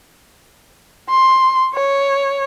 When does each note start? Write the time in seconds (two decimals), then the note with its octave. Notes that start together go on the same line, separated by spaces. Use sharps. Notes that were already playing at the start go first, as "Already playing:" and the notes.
1.10 C6
1.74 C#5